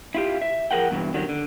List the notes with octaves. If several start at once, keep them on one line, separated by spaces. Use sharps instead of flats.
E4 F4 G4
E5
F3 G#4 A#4 F#5 G5
E2 G2 B2 E3
D3 D#3 F#3 G3
D3